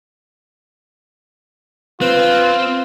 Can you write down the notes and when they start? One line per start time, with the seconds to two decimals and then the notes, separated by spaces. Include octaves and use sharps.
2.01 C4 F4 B4